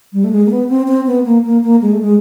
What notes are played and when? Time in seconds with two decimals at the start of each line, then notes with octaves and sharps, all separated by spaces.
0.13 G3
0.24 A3
0.32 G#3
0.46 A#3
0.51 B3
0.69 C4
0.88 C4
1.07 B3
1.25 A#3
1.45 A#3
1.63 A#3
1.82 G#3
1.92 A3
2.01 G#3